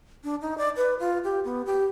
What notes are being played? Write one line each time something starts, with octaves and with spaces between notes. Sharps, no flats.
D4
D#4
D5
B4
F4
G4
B3
G4